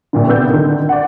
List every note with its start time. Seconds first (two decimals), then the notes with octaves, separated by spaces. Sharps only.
0.13 A#1 A#2 D3
0.27 C3 B3 D5 E6 G6
0.49 D3 D#3
0.89 D5 F#5